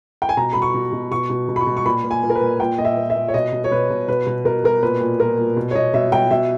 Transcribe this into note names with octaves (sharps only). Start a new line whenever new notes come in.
G5
G#5
B2 A#5
B2 B5
C#6
B2
B2
B2 C#6
B2
B2
B5
C#6
B2
C#6
A#2 B5
A#2
G#5
A#2
A#4
B4
A#2
A#2 G5
A#2 D#5
E5
A#2
E5
A#2
C#5
B2 D#5
B2
C#5
B2 B4
B2
B2 B4
B2
B2 A#4
B2 A#4
A#2 B4
A#2
A#2 A#4
A#2
B2
C#5
B2 D#5
B2 E5
B2 G5
B2 E5